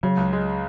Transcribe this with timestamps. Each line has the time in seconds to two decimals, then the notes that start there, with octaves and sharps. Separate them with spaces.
0.03 C#3 F#3
0.17 C#2
0.33 G#3